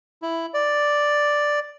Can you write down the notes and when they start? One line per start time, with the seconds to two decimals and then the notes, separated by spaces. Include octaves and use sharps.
0.22 E4
0.54 D5